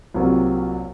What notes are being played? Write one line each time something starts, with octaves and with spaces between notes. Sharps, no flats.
C2 C3 F#3 A#3 F4